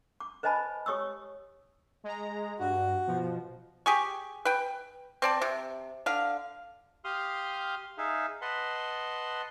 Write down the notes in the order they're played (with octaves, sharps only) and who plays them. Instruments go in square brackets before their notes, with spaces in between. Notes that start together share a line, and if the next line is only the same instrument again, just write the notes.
[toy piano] D6
B4 C5 D#5 G#5 A5 B5
G4 C#5 C#6 D#6 E6
[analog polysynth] G#3 A#5
[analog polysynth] G2 [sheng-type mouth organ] F#4
[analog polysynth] B2 F3
[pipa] G4 G#4 C#6
B4 G5
C4 D5 A5
C3
D3 F5
[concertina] G4 F5 C6 D#6 F6
D#4 G#4 E5 F5
B4 D#5 F#5 A5 B5 C6